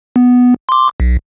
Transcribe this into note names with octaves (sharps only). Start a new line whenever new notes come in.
B3
C6 D6
B1